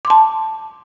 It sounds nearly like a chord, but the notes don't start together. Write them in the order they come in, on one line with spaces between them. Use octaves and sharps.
D6 C6 A5